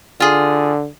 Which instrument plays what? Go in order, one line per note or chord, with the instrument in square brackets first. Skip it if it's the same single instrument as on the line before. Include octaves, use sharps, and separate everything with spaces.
[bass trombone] D3 [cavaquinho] F4 G#4